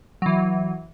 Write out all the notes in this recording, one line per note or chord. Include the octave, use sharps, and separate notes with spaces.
E3 F#3